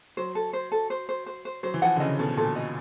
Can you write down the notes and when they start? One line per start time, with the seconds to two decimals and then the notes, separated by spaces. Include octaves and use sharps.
0.17 F#3 C5
0.35 A4
0.53 C5
0.72 A4
0.90 C5
1.09 C5
1.26 C5
1.45 C5
1.63 F#3 C5
1.74 E3
1.82 F3 F#5
1.96 D3
2.00 C#3 D#5
2.19 B2 A4
2.37 A#2 A4
2.56 D#5